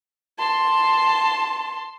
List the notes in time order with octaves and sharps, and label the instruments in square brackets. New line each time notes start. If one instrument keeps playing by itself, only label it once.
[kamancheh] A5 C6